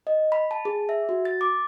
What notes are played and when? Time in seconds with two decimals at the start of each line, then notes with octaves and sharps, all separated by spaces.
0.07 D#5
0.32 B5
0.51 A5
0.65 G#4
0.89 E5
1.09 F#4
1.25 A6
1.41 D6